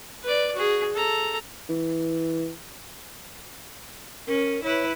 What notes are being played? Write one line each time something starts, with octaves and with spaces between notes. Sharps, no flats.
B4 D5
F#4 G#4
A4 A#5
E3
C#4 A#4
E4 B4 C#5